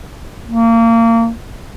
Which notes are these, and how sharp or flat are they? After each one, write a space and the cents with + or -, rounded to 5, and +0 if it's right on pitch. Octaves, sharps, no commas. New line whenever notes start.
A#3 -30